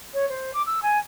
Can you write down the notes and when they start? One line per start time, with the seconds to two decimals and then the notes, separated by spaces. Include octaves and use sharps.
0.14 C#5
0.30 C5
0.54 D6
0.66 E6
0.83 G#5